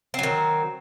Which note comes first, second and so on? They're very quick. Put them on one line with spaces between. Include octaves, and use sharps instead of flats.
C4 F#3 D#3